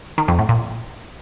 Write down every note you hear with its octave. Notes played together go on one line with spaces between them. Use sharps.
D#3
F2
A2
A#2